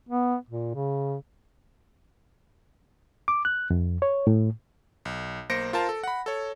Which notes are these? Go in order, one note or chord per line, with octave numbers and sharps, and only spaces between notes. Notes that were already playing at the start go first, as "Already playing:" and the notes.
B3
A#2
C#3
D6
F#6
F2
C#5
A2
B1
B1 A#3 C5 A#6 C#7 D7
F4 A#4 C5 A5
A4
F#5 B5
A4 C#5